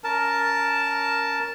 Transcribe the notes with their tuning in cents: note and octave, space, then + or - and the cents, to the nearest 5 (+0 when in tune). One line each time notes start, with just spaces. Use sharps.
C#4 +20 A#4 +0 A5 +0